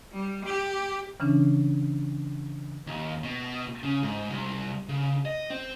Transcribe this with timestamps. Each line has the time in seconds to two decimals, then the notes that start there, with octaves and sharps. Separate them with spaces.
0.13 G3
0.46 G4
1.20 C#3 E3 C#4 D4
2.87 D#2
3.24 B2
3.83 C#3
4.03 G#2
4.30 C2
4.89 C#3
5.25 D#5
5.50 C4